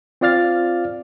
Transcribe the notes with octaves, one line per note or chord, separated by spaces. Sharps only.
C4 F4 D5 F5 F6 A6